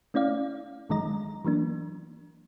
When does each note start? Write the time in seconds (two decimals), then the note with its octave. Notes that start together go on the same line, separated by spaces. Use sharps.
0.14 A3 C#4 E4 D5 F5
0.89 G1 D#3 F#3 G#3 D#5 A#5
1.45 E3 F#3 A#3 D4